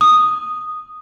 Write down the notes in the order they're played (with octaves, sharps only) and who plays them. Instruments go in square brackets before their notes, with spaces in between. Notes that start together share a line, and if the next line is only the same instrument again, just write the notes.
[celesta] D#6